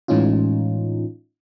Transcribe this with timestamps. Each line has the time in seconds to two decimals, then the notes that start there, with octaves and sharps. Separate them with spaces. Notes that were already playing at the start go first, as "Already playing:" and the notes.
0.08 A2 E3 G#3 C#4 D#4 F4